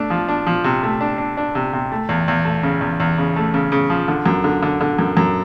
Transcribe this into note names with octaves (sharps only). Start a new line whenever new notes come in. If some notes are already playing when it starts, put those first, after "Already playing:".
Already playing: A3 D4
F3
D4
F3
C3
A3
D4
D4
D4
C3
C3
A3
E2
E2
A3
C#3
E2
E2
C#3
A3
C#3
C#3
F3
D3
F#2
D3
D3
D3
F#2
F#2